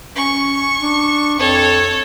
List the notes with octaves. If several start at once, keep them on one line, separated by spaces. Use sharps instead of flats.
C#4 C#6
D4
F2 A4 C#5